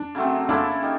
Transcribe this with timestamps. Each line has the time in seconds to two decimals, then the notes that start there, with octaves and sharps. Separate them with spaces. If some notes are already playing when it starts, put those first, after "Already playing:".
Already playing: D4
0.15 C#3 F#3 A3 C4
0.49 A#3 C#4 D4 E4 A4
0.82 D#4 G4